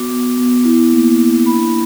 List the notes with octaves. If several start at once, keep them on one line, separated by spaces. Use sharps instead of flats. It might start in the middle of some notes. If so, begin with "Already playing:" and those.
Already playing: B3 F#4 D6
B3
B3
E4
A#3
E4
D4 B5